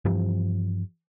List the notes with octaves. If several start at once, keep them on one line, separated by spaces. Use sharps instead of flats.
G2 E3 F3 C4